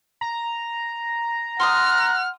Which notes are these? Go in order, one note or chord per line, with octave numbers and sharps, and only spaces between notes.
A#5
F#5 C6 D6 D#6 F6